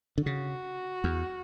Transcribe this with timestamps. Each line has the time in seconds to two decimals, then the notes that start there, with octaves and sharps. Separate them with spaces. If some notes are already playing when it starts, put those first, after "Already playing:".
0.18 D3
0.25 C#3 F#4
1.04 E2